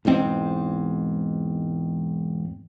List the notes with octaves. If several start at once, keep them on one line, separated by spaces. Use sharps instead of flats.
E1 E2 G#2 C4